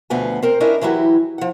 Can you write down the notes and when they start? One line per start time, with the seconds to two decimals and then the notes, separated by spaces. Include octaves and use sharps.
0.10 D2 B2 F3 B3 G#5
0.42 C4 A#4 C5
0.60 C#4 D4 E4 F4 A#4 D#5
0.81 E3 F#3 E4 F#4 G4
1.38 F3 F#5